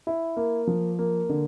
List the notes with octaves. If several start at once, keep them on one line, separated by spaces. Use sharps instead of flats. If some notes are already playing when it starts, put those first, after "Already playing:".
E4
A#3
F3
A#3
D3